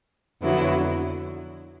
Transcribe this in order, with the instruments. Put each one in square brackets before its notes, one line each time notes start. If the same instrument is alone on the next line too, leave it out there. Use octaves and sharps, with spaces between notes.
[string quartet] F2 D3 F#3 B3 E4